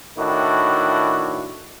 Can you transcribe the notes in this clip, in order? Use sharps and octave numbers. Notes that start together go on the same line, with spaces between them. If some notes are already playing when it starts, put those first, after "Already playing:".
A2 D#3 D4 E4 F#4